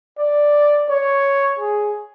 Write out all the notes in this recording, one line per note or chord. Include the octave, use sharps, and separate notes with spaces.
D5
C#5
G#4